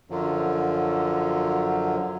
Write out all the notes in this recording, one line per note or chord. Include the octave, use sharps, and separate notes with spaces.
F#2 D3 F3 F#3